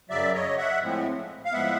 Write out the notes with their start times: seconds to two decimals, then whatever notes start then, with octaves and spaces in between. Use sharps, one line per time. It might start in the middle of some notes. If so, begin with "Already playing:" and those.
0.09 F#2 C#3 F#3 D5 E5
0.33 C#5 D#5
0.58 E5 F#5
0.81 A2 F3 G#3 C4
1.45 F5
1.52 A2 F3 G#3 B3 E5 F#5